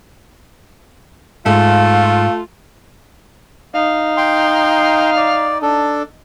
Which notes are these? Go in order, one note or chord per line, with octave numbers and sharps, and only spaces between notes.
G#2 A3 F4 F5
D#4 F5
G5 C6
D5
D4 A4